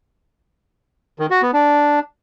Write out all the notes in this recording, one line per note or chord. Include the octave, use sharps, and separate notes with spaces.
D#3
F#4
B3
D4